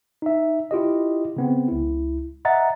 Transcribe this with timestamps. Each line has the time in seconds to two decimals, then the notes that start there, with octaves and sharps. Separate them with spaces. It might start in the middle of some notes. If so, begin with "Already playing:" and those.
0.22 D#4 E5
0.71 E4 F4 G4 D#5
1.37 C#3 B3 C4
1.68 C#2 E4
2.45 D#5 E5 F#5 A#5 A6